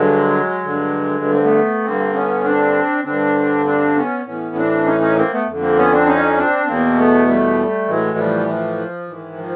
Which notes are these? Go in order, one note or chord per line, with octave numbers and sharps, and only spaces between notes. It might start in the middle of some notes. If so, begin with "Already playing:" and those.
Already playing: G2 D3 F#3 G#3
G2 D3
B3
C4
A3 B3
G2 D3 A#3 C4
B3 C#4
C4 D4
G2 D3 C4 D4
C4 D4
B3 C#4
A2 E3 B3 C#4
C4 D4
C#4 D#4
C#4 D#4
A#3 C4
A3 B3
F2 D3
A#3 C4
B3 C#4
C4 D4
C#4 D#4
C4 D4
E2 B2 A#3 C4
A3 B3
G3 A3
A2 E3 F#3 G#3
F3 G3
F3
G#2 D#3 E3
F3